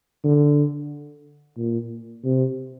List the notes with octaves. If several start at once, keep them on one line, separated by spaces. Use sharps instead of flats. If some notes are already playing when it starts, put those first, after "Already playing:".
D3
A#2
C3